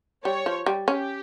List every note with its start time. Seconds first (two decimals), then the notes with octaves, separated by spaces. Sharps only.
0.25 G3 C#5
0.46 F3
0.66 G3
0.88 C#4 G4